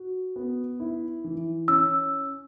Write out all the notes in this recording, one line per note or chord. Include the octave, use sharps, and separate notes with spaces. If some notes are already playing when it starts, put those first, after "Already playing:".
Already playing: F#4
B3
E4
E3
C#4 E6